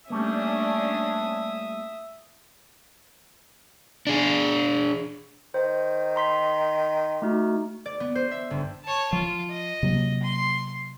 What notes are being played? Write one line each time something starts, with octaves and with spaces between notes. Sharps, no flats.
G3 A3 A#3 C#4 D4 E5 D#6
D4 G#4
D#3 C5
A#5 C6 B6
A3 D#4 F#4
D5
B3
C5
E5
G1
C#5 A5
F3 F4
D#5
C3 F#3 A#3
C6